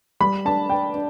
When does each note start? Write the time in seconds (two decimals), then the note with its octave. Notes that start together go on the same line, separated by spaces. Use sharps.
0.20 G3 B5
0.45 D4 A5
0.69 D4 G5
0.95 D4